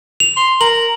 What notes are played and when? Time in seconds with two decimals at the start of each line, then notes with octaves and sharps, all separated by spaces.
0.20 F7
0.36 C6
0.61 A#4 F#7